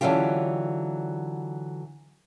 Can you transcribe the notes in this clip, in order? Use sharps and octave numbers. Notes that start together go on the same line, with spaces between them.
D3 E3 F#3 C#4 F4 G4